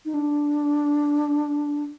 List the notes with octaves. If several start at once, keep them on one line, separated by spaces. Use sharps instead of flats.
D#4
D4